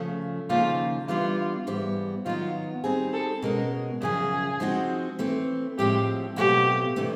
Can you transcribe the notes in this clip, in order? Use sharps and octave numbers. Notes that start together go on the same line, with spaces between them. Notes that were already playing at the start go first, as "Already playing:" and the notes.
Already playing: C#3 F3 A3
D#2 C#3 F3 A#3 D#4 F4
E3 G3 B3 D4 F4
G#2 E3 G3 B3
D#3 F#3 B3 F4
G3 C4 D#4 G#4
A4
B2 G#3 C#4 A#4
F#2 C#3 F3 G#4
F3 G#3 C4 D#4 F#4
E3 A3 C4
A2 F3 G#3 C4 G4
B2 F#3 A3 C4 F4 G4
C3 E3 A3 D4